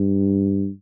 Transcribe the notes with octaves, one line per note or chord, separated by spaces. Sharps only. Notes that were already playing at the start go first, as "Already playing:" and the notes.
Already playing: G2